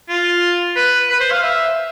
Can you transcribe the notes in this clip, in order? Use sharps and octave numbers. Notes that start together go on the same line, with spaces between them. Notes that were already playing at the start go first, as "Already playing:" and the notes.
F4
B4
B4
C5
F5
E5